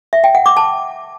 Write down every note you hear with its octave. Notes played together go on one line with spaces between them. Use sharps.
E5
G5
F#5
D6
A5